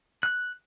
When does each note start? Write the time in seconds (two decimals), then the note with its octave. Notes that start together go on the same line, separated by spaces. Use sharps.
0.23 F#6